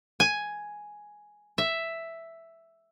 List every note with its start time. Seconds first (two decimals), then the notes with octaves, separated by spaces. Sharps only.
0.20 G#5
1.58 E5